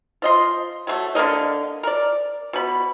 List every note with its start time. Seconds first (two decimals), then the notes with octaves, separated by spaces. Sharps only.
0.22 F3 D#5 C6
0.87 F#3 A3
1.15 D3 A#3 A#4 D#5
1.83 A#4 D5
2.53 B2 B5